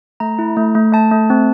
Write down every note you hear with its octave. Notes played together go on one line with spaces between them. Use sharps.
A3 A#5
E4
A3
A3
A3 A5
A3
C4